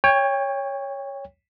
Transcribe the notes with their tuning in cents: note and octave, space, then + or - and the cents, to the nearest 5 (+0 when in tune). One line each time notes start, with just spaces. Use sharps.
C#5 +0 G5 +30